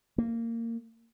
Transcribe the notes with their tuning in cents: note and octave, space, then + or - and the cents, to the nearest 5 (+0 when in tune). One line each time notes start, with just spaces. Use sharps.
A#3 -20